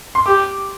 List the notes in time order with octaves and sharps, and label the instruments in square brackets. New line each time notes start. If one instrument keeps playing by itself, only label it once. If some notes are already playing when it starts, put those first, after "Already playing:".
[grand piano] C6
[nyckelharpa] G4 [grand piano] D6